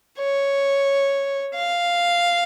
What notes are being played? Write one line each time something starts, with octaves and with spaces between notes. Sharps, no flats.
C#5
F5